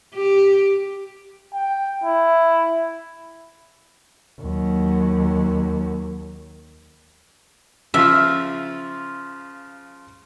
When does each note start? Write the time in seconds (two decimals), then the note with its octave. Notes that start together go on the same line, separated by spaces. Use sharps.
0.14 G4
1.53 G5
2.04 E4
4.41 D#2 F#3
7.94 C#3 F3 F4 E5